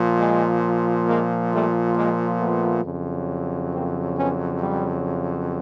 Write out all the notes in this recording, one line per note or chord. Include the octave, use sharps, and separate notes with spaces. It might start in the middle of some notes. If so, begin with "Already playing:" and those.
Already playing: A#2 F3
G#3
G#3 A#3
G3 A3
G#3 A#3
A3 B3
F2 C#3 F#3
A#3 C4
B3 C#4
G3